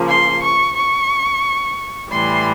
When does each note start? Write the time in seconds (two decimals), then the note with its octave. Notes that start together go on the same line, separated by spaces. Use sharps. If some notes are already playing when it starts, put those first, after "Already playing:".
Already playing: C#3 F3 A#3
0.09 C6
0.43 C#6
0.77 C#6
2.11 A2 E3 G3 C6